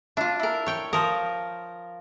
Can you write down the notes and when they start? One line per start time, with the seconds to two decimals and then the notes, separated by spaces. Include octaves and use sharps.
0.17 D4 E4 F4
0.39 E4 A#4
0.66 C#5 G5
0.93 F3 A#4 D#6